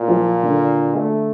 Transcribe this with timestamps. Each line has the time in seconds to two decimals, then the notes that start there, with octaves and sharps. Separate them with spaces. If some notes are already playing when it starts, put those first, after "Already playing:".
Already playing: A#2
0.08 F3 F4
0.43 D3 D4
0.96 A3